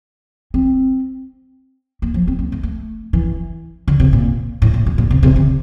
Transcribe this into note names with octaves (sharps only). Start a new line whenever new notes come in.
C4
A#3
F3
C4
A#3
A3
A3
E3
D3
C3
A#2
A2
A#2
A#2
A#2
C3
C3
D3